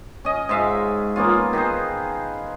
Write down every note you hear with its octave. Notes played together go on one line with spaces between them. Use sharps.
C#4 D#5
G#2 G#3 E5 F5
A#3 B3 C#4 F4
D#3 G#4 B4 C5